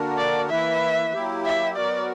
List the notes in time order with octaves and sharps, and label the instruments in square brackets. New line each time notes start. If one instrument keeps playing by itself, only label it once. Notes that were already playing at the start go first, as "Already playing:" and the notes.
Already playing: [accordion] D3 A#3 D4 F#4 A#4
[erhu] D5
[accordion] E3 A#3 E4 B4 [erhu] E5
[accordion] F#3 A#3 E4 G4
[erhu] E5
[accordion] F#3 B3 F#4 A#4 [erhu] D5